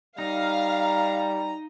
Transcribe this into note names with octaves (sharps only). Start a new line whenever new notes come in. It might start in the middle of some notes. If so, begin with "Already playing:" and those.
G3 D#4 F5 A#5